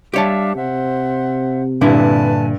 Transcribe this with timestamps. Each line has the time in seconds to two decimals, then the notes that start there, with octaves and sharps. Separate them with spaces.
0.14 G3 D4 G4 C#5 E5 F5 A5
0.56 C3 C5 E5 F#5
1.81 G2 A#2 D3 E4 B4 G#5 A5